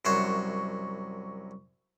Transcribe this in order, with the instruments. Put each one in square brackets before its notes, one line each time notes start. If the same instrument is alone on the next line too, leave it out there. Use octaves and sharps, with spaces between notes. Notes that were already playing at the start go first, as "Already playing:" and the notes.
[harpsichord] C2 F#2 C5 C#5 F#5